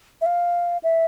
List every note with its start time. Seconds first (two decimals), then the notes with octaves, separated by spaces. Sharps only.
0.21 E5
0.26 F5
0.83 E5